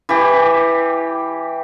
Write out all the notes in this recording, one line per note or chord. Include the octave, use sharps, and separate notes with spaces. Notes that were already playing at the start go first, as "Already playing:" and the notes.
E3 G4